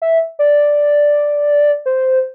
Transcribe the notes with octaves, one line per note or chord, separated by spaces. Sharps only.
E5
D5
C5